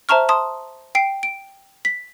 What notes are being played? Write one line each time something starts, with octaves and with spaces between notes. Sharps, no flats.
C5 E5 A5 A#5 C#6 F6
A5 C6 D#6
G5 C7 D7
D7
B6